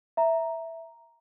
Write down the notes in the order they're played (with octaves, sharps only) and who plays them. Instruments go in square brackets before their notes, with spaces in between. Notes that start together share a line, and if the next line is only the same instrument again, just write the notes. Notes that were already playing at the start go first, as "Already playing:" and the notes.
[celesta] E5 A#5